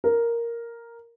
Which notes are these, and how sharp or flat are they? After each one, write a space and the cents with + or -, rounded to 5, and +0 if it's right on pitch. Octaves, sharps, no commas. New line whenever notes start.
A#4 +0